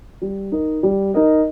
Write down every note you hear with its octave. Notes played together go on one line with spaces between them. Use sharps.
G3
D#4 A#4 D#5
G3
D#4 A#4 D#5